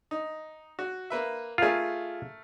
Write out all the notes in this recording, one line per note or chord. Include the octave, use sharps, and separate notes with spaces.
D#4
F#4
A#3 B4 E5
A3 F4 G#4 A#4